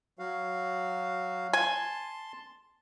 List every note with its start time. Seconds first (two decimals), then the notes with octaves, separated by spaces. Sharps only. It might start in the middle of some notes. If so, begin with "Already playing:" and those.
0.19 F#3 F#4 F5
1.53 G#5 A5 C6